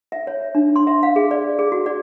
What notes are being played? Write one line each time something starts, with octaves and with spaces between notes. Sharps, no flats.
E5
C#5
D4
C6
E5
F5
G#4
D5
G#4
F#4
D5